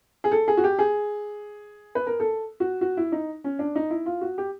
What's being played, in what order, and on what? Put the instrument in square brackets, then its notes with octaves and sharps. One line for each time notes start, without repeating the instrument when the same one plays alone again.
[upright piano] G#4
A4
G#4
F#4
G4
G#4
B4
A#4
A4
F#4
F#4
E4
D#4
C#4
D4
D#4
E4
F4
F#4
G4